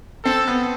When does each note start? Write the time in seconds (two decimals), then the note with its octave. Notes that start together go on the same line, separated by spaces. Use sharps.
0.25 C4 A4
0.48 B3